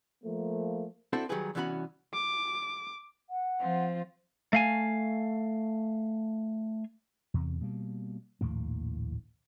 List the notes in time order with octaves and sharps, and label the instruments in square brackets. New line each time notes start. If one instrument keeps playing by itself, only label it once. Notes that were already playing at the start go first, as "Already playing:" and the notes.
[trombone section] F3 A3 A#3
[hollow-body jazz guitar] C4 D4 E4 F#4 A4 C5
D#3 F#3 G3 G4 G#4 B4
C2 E3 B3 C#4 F#4 B5
[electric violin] D6
[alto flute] F#5
[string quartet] F3 C4 F4
[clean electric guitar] A3 F5 G#5
[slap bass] E2 C3
B2 G3 A#3
A#1 D#2 A2 A#3